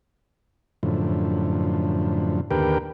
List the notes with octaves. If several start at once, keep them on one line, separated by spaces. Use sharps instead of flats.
F#2 A2 D3 F3
D#2 D3 G4 A#4 B4 G5